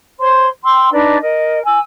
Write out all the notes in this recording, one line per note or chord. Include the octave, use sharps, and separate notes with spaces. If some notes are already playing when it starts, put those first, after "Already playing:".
C5 C#5 C6
G5 C6 E6
D4 D#4 B4 D5
A#4 D#5
G#5 E6